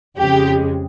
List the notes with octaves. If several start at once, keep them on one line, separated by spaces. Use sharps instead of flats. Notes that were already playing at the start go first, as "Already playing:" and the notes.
F2 C#3 G#3 G4